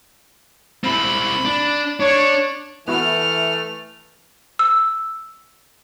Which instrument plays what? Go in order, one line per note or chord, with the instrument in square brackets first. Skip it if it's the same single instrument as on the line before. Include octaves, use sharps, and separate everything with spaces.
[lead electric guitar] C4 E4 [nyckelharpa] B5
[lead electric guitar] D4
[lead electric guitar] D4 [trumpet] C#5
[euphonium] E3 [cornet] A3 [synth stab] B3 E4 F#4 [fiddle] F6
[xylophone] E6